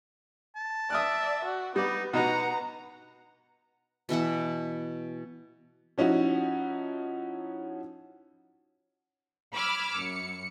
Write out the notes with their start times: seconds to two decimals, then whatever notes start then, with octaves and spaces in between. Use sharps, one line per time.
0.56 A5
0.90 D5 E5 D#6 F6 F#6
1.45 F#4
1.76 G3 B3 D#4 D5
2.13 B2 D#4 F#4 B4 F#5 A#5
4.09 B2 E3 E5 F#5
5.98 F3 C#4 D#4 E4 F#4
9.55 B5 D6 E6 F6 G#6
9.95 F#2 C#7